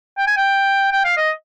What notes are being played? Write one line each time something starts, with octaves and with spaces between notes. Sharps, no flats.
G5
G#5
G5
G5
F5
D#5